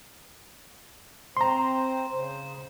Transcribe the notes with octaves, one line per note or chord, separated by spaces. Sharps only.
C4 C5 A#5 C6
C#3 C5